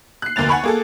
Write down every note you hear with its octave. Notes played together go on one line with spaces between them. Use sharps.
F#6 C7
F1 D2 A#3 A6 F7
F#5 G#5 B5 C#6
A#3 G#4 A4